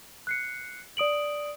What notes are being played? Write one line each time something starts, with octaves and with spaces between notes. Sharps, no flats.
F#6 C7 C#7
D5 D#6 D7 F#7